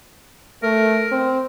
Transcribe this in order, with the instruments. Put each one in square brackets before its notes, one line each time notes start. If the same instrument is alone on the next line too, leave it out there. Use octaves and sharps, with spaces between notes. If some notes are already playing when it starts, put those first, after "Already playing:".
[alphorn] A3 [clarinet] A#4
[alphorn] C4